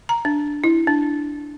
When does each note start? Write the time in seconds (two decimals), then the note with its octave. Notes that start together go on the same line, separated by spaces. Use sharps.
0.09 A#5
0.25 D4
0.64 E4
0.87 D4